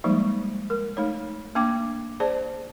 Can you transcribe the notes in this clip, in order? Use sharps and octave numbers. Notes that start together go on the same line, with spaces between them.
F3 G3 G#3 A#3 D#4
A#4
A3 D#4 C#5
A#3 D4 G5 D6
G#4 C5 D5 A5